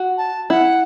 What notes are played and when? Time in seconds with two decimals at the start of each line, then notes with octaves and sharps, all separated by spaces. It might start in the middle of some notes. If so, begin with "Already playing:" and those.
Already playing: F#4
0.17 A5
0.50 E4 F#5